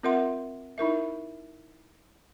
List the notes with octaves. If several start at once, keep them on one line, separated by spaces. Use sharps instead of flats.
C4 F4 A#4 E5 F#5 C6
D#4 E4 A#4 E5